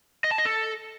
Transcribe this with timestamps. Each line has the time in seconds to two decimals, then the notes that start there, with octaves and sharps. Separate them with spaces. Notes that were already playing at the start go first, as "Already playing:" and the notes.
0.24 D#5
0.31 A5
0.38 D#5
0.45 A4